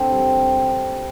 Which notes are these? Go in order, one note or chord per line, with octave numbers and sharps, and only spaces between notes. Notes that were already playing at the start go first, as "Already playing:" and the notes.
Already playing: D3 C4 A4
G3